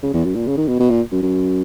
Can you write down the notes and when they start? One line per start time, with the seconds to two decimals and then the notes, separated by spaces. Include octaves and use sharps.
0.03 C#3
0.14 E2
0.25 F#2
0.35 A#2
0.47 C#3
0.57 D#3
0.68 B2
0.80 B2
0.90 A#2
1.12 F#2
1.23 F#2